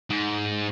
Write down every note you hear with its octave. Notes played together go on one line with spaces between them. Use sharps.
G#2